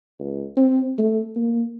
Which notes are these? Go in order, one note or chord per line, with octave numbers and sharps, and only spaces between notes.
C#2
C4
A3
A#3